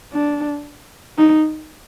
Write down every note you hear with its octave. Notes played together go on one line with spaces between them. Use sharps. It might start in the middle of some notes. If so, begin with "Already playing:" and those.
D4
D#4